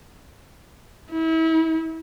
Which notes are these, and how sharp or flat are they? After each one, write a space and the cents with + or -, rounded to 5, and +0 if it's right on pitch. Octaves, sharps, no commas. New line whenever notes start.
E4 -35